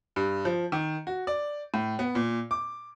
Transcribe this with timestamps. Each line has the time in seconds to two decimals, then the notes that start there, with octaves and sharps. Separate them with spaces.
0.16 G2
0.45 F3
0.72 D#3
1.07 F#4
1.27 D5
1.74 A2
1.99 B3
2.15 A#2
2.51 D6